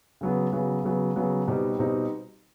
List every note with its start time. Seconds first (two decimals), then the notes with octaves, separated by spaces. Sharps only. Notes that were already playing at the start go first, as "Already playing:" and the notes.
0.21 C#3 F#3 B3
0.53 C#3 F#3 B3
0.84 C#3 F#3 B3
1.16 C#3 F#3 B3
1.48 B2 G3 C4 D#4
1.79 B2 G3 C4 D#4